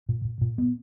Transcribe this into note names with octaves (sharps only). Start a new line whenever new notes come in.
A#2
A#2
A#2
B3